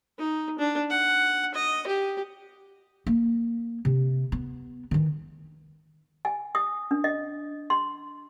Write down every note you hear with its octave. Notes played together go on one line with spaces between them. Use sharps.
D#4
D4
F#5
D#5
G4
A#3
C3
B3
D#3 E3
G#5
D#6
D4
D#5
C6